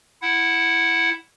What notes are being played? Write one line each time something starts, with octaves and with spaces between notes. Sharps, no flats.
E4 F#5